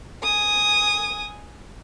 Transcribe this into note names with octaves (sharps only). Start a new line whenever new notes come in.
G#5 D#6